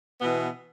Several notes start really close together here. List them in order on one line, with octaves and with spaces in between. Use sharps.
B3 B2 E3